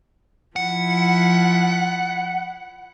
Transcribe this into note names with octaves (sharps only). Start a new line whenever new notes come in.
F3 E4 F#5